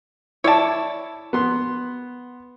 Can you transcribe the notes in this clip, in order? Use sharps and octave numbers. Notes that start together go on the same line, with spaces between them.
E4 C#5 D5 A5
B3 C6